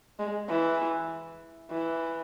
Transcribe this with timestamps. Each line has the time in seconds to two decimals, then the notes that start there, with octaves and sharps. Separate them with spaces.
0.19 G#3
0.49 E3
1.71 E3